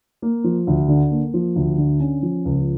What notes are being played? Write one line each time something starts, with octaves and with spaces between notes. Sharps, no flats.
A#3
F3
D2
D3
A#3
F3
D2
D3
C#4
F3
C#2